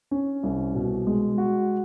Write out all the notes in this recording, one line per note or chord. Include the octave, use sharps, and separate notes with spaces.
C#4
C2
B2
G#3
F#4